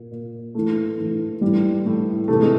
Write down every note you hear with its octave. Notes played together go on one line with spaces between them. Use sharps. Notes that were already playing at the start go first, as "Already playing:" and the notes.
Already playing: A#2
A#2
A2 E3 A3
A2 E3
A2 E3 G3
A2 E3
C3 E3 A3
G#3